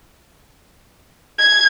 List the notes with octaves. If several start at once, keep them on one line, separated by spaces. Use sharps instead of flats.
G#6